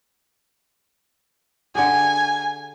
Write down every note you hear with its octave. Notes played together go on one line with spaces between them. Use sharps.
D3 G4 G#4 G#5